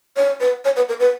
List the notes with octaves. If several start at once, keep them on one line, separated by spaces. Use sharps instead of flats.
C#5
B4
C#5
B4
A#4
B4